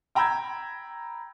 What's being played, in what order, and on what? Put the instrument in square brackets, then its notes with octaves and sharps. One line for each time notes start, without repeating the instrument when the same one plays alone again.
[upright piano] G5 A#5 B5 E6 G6 G#6